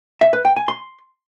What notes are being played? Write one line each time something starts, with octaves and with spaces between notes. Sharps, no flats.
E5
B4
G5
G#5
C6